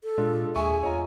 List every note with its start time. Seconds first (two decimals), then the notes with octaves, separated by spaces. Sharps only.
0.04 A4
0.18 A#2 G#3 D4 F4
0.56 D#2 G#4 E5 G#5 C#6
0.83 E2 F4 C#5 D#5 A#5